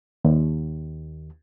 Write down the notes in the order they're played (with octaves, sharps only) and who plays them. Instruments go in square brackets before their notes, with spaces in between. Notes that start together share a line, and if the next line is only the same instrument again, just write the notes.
[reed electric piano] D#2